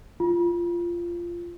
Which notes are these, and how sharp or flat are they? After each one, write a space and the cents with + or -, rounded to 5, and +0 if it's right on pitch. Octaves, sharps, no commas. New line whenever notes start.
F4 -15